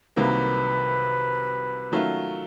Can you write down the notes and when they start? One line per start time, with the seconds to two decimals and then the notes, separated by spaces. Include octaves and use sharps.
0.16 C2 C3 D#3 F#3 A#3 B4
1.92 D#3 F#3 A3 C#4 F4